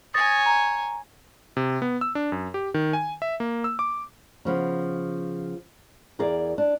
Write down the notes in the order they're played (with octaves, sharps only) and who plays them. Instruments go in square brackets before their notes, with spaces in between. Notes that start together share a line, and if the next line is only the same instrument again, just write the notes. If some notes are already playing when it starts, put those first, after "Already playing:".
[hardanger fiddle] C#5 G#5 [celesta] D#6 A6 A#6
[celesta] A#5
[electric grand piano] C3
B3
E6
D4
F#2
G4
D#3
G#5
E5
A#3
E6
D6
[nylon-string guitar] C#3 F3 B3
E2 G#4 A#4 D5
D4